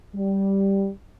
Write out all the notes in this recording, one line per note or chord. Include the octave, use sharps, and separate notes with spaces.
G3